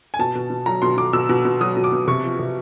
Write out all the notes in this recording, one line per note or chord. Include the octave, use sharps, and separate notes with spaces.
G#5
B2 A5
B2
B2
F#3 A#5
B2 C6
B2 D6
B2 E6
B2
B2
F#3 D#6
B2
D6
B2
C3 C#6
F3
C3